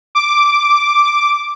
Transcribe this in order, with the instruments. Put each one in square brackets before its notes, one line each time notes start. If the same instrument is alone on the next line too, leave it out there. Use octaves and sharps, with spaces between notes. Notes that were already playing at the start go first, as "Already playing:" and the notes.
[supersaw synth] D6